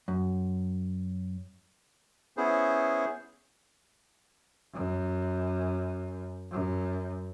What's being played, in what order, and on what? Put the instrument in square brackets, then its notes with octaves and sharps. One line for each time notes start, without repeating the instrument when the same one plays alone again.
[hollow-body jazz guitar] F#2
[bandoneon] B3 C#4 E4 G#4 C5
[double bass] F#2
F#2